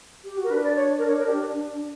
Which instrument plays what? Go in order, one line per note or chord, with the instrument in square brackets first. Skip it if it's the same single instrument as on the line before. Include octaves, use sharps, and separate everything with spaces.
[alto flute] G4
F#4
[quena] A#4
[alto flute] D4 [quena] B4
[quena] D5
C#5
A#4
C#5
A#4
G4